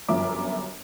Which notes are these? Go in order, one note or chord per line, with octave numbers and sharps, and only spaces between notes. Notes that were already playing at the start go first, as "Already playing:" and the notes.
G1 F#2 F3 E5 D6